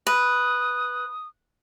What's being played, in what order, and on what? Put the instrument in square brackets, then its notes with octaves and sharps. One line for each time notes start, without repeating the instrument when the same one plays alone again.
[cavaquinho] B4 [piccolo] D#6